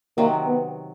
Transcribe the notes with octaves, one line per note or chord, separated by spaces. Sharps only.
C3 D#3 F#3 A#3
B3